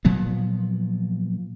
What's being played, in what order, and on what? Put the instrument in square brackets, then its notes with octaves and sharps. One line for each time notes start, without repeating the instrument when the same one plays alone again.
[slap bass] A#2 F3 F#3 B3